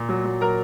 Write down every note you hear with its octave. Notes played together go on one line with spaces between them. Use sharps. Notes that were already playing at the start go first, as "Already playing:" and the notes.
Already playing: A#2
F#3
F#3
F#3 A#4 A#5